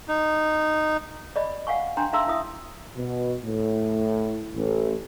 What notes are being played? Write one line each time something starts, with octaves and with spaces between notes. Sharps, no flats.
D#4
D5 D#5 B5
F5 F#5 G#5 C#6
D4 G5 G#5 A#5 C6
D#4 E5 F5 A#5 C6 E6
E4 E5 D#6
B2
A2
A1